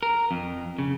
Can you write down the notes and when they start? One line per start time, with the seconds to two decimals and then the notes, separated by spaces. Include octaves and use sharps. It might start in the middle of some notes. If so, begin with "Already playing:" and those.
0.03 A#4
0.31 F2
0.79 C#3